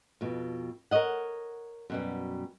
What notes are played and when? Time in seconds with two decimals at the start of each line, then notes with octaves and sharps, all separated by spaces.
0.21 F2 B2
0.91 A#4 B4 C#5 D#5 F#5
1.90 F#2 B2 G3